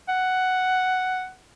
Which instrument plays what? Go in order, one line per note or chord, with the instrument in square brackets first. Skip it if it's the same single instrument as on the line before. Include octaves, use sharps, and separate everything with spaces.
[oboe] F#5